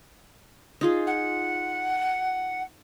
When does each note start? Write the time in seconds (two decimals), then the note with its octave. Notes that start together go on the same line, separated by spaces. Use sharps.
0.81 D#4 F4 G#4
1.06 F#5